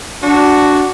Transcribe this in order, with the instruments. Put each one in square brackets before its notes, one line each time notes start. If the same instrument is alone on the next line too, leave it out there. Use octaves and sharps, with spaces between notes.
[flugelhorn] D4 [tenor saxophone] F#4